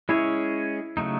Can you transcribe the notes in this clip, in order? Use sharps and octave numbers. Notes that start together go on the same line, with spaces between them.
G#3 C#4 E4 G#4 C#5
C#3 F#3 A3 D#4